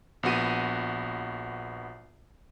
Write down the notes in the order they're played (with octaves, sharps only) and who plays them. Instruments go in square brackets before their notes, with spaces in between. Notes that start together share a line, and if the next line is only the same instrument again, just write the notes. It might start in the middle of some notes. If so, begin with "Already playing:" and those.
[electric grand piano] A#1 B3 F#4 D#7